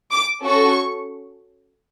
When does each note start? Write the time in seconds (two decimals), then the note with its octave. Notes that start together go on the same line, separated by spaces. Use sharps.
0.11 D6
0.44 C#4 F#4 A4 C#6